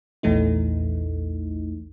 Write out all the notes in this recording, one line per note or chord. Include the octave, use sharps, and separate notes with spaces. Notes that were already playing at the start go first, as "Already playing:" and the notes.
A#1 E2 E3 A3 D#4